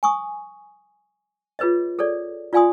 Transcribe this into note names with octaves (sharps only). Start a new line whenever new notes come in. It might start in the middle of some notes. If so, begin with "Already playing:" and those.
G#5 C#6 D#6
F4 G#4 B4 C#5 D#5
G#4 A4 C#5 D5
F4 D5 F5 G#5 C6 D#6